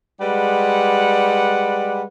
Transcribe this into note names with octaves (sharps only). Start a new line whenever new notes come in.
G3 G#3 B4 D5 F#5